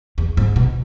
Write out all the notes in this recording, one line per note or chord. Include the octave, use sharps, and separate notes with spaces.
E2
G#2
B2